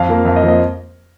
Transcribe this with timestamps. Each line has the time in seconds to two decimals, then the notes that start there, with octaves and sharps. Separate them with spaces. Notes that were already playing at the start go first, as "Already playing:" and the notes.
Already playing: F2 F5
0.08 F3 A#3
0.25 F2 F5
0.36 D#5
0.42 F3 A#3
0.48 D#5